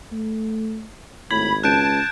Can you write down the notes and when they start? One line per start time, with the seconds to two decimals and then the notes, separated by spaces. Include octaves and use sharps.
0.12 A3
1.31 G#1 A2 B5 G#6
1.63 C#2 A5 F#6 G6 D7